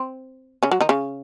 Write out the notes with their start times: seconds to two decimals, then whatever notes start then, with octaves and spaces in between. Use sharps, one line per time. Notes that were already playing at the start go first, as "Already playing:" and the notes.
Already playing: C4
0.63 C#3 C#4
0.71 F#3 F#4
0.81 D#3 D#4
0.89 C#3 C#4